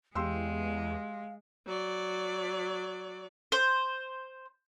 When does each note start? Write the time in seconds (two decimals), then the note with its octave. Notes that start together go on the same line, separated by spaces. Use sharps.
0.15 E2 G#3 G4 F5 C6 E6
1.66 F#3 D5
3.52 C5